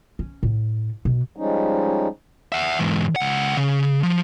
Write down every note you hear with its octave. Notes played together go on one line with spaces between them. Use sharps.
C#4
A2
B2
F3 G3 G#3 C#4 D#4
E5 F#5
E2 G#2
C#2 F#5
C#3
F3